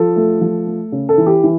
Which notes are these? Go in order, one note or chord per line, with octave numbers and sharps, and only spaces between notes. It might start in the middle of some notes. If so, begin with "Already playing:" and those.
Already playing: F3 A4
A3
F3
A3
C#3
A4
E3
G4
E3